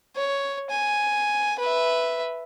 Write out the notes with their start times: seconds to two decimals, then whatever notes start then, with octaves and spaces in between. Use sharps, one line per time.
0.16 C#5
0.70 G#5
1.59 B4 E5